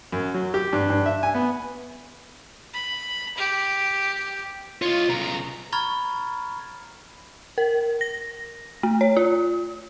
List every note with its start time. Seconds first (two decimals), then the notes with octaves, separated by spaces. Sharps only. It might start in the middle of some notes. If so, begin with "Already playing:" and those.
0.12 F#2
0.34 F#3
0.54 G4
0.73 G2
0.90 G2
1.06 E5
1.23 G#5
1.34 B3
2.73 B5
3.37 G4
4.82 F4 C#5 D#5
5.10 B1 C#3 A#5
5.73 A#5 B5 C#6 F6 G#6 A6
7.58 A#4
8.01 A#6
8.83 A3
9.01 C#5
9.17 F4